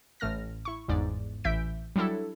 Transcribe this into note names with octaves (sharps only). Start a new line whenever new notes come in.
A1 A2 A3 F6 A#6
E4 C#6
G1 E2 G#2 D5
A1 E3 E5 G6 B6 D7
F#3 G3 D4 E4 A4